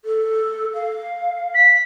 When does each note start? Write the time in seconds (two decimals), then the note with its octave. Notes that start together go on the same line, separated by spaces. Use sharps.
0.05 A4
0.74 F5
1.55 B6